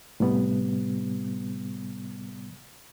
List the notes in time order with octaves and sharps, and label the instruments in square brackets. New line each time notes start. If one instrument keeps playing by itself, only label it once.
[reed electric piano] A2 C3 G3 B3